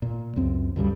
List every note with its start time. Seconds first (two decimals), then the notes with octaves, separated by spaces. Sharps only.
0.02 A#2
0.36 C#2 F#2 C4
0.76 D2 G2 C#3 G3